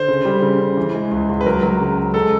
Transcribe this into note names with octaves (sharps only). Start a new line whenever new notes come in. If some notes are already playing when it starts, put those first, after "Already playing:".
Already playing: D3 C5
C#3
G3
C#3
C#3
E3
G#3
C#2
C#2
B4
F#3 A#4
F#3
C#3
C#2
G#3 A4